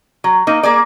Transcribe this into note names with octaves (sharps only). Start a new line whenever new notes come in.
F#3
A#3 D#4
A#3 G#4 D5